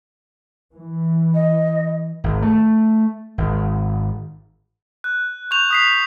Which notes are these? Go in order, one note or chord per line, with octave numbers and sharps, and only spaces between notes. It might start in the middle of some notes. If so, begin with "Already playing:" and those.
E3
D#5
G#1
A3
G#1
F#6
C#6 G6 F7
D#6 B6 C7